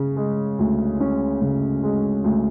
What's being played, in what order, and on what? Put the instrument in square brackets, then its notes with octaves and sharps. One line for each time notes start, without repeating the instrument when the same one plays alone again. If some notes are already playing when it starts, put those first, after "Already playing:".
Already playing: [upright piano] C#3 C#4
G#3
D2
C#4
C#3
G#3
D2